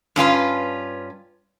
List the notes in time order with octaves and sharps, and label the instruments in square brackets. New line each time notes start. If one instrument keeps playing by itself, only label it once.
[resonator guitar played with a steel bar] G2 C#4 F4 B4